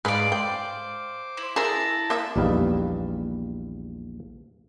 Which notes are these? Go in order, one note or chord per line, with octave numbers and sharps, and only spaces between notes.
G#2 G#3 B4 D5 F5
C5 G5 D6
E4
E4 G#4 A#4 A5 A#5
A#3 E5
A#1 E2 G3 D#4 B4 F5